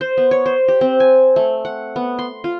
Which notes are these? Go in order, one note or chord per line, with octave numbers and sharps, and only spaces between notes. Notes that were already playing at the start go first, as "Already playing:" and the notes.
C5
B3
C#5
C5
G4
C4
G#5
A3
F#5
B3
C6
F4